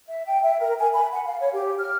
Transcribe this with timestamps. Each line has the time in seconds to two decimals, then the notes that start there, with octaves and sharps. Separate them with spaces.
0.07 E5
0.27 G5
0.43 E5
0.59 A#4
0.79 G#5
0.94 B5
1.13 F#5
1.25 F5
1.40 C#5
1.53 G4
1.78 F6